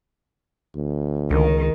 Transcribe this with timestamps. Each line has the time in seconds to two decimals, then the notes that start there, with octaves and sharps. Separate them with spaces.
0.75 D2
1.31 C#2 D#3